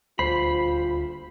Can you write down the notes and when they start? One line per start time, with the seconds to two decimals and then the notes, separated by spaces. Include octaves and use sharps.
0.19 D#1 D2 F4 C5 B5 C7